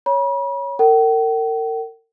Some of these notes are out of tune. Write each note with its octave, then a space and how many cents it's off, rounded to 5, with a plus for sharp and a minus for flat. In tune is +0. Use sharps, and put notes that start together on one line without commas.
C#5 +0 B5 -40
A#4 -40 G5 -45